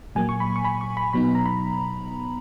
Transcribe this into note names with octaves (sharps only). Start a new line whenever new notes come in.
A#2 F#3 A#3 G#5
C#6
B5
C#6
B5
C#6
B5
B2 F#3 B3 D#4 B5
A#5
B5